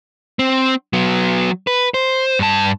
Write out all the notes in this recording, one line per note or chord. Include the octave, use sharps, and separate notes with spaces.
C4
F#3 B3
B4
C5
G2 A5